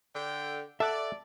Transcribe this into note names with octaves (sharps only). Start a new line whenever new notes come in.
D3 G5
A4 D5 E5 F#5